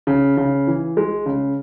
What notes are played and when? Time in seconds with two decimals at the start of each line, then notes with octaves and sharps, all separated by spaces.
0.07 C#3
0.37 C#3
0.67 E3
0.97 G#3
1.26 C#3